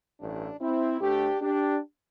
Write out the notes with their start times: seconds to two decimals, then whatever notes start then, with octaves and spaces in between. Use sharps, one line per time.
0.20 A1 G2 E3 A3 D4
0.61 C4 E4
1.01 D2 D3 A3 D4 G4
1.41 D4 G4